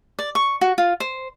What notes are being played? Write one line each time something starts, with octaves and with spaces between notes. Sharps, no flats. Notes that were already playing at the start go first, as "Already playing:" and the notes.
D5
C#6
F#4
F4
C5